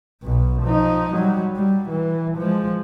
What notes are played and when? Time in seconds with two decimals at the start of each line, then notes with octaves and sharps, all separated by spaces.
0.23 B1 B2
0.63 F3 D#4
1.14 F#3 G3
1.56 G3
1.89 E3
2.37 F3 G#3